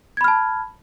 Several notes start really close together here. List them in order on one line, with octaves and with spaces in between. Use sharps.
G#6 B5 F6 A5